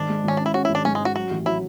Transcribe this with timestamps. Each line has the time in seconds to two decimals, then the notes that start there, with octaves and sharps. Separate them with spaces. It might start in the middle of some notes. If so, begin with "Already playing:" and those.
Already playing: G#1 D4
0.09 G#3
0.24 G#1 C#4
0.37 C#4 D4
0.46 E4
0.54 C#4 F#4
0.65 E4
0.69 G#1
0.75 D4
0.85 G#2 C#4
0.95 G#3
1.00 C#4 F#4
1.15 F#3 F#4
1.31 A1
1.46 F#3 E4